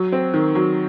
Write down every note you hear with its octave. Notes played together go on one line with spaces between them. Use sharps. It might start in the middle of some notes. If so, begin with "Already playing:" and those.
Already playing: F#3
C4
D#3
F#3